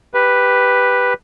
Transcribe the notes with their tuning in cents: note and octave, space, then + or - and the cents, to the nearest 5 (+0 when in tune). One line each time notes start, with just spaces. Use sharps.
G4 +0 B4 +0